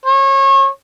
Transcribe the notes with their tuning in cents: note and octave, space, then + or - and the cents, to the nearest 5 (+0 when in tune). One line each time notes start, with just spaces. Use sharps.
C#5 -30